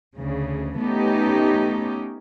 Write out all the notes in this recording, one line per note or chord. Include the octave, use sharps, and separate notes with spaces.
D2 C#3
A3 B3 C#4 D#4 G4